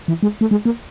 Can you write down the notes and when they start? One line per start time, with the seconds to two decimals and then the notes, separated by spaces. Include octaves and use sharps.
0.08 E3
0.23 G#3
0.41 A3
0.51 G#3
0.65 A#3